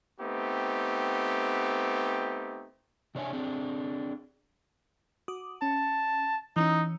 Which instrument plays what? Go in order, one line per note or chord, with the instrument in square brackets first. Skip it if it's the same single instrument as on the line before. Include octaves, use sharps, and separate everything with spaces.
[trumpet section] A3 B3 C4 D#4 G4
[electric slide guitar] C3 D4 C#5 E5 G#5
C4 D4 G#4
[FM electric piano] F#4 D6 D#6
[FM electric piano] C#4 [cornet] A5
[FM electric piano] E3 C#4 [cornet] D#4